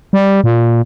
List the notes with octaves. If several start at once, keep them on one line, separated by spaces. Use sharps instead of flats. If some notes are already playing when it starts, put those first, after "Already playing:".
G3
A#2